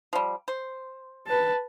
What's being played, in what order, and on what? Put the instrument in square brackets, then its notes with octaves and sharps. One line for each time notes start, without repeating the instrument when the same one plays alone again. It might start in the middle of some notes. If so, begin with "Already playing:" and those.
[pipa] F3 G3
C5
[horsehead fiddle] B4 A5